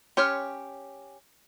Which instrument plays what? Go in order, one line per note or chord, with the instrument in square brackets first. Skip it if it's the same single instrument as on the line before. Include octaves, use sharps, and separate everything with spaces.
[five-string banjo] C#4 G4 C#5 [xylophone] C6 F6